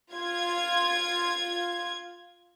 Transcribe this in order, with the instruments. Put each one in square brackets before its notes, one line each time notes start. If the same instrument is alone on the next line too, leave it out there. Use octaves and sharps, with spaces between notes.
[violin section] F4 G#6